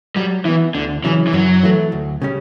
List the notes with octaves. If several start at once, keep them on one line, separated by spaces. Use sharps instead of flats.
F#3 G3
E3 B3 E4
D2 D3
C#3 E3 F#3 C#4
E3
F#2 F#3
E3 A3
D2
C#3 G3 C#4